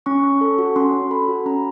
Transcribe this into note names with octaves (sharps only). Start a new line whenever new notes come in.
C#4 C#6
C#4
A4
F#4
C#4 C6
C#4
A4 B5
F#4
C#4 A#5